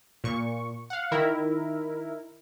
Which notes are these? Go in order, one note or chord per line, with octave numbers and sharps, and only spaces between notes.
A#2 C#6
F5 F#5
D#3 E4 A#4